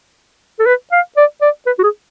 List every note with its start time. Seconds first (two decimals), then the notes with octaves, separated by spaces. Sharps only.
0.59 A4
0.66 B4
0.92 F5
1.17 D5
1.42 D5
1.67 B4
1.79 F#4
1.84 G#4